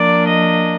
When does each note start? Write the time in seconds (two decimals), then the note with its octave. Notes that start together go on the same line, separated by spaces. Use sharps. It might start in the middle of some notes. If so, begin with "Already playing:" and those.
Already playing: F3 A#3 D4 D5
0.27 D#5